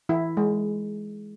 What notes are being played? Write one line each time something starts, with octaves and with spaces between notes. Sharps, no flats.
E3 E4
G#3